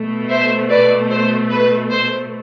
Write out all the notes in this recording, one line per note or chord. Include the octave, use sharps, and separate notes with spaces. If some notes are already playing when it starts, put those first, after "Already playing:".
Already playing: B2 A3
C5 E5
B4 D5
C5
B4
C5